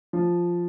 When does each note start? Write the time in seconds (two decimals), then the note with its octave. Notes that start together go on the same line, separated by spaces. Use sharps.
0.13 F3